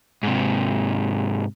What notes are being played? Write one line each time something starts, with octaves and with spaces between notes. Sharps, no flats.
G#2 C3